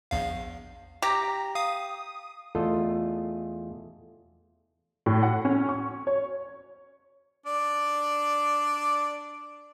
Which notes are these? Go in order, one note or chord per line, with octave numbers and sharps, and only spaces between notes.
A#1 E2 F5
G4 A#5
F5 D#6
E2 A3 F4 A4 D#5
A2
F#5
C#4
C#6
C#5
D4 D5